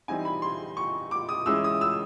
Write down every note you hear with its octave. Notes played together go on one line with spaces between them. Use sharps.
E3 G3 C4 D#4 G#5
B5
C6
C#6
D6
D#6
E3 G#3 C#4 E4 E6
D#6
E6